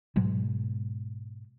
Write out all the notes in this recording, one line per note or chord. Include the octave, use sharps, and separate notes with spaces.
G#2 B2 F#3 G#3